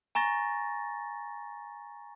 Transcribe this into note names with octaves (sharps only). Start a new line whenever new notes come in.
G#5 A#5 C#6 A6 A#6